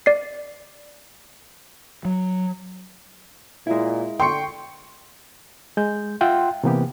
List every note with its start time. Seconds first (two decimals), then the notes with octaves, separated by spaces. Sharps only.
0.06 D5 C7
2.05 F#3
3.67 A#2 G#3 E4
4.20 D3 G5 C6 C#6 C#7
5.77 G#3 G6
6.21 F4 E5 F#5 G5 C6
6.64 C3 E3 A#3 B3 G4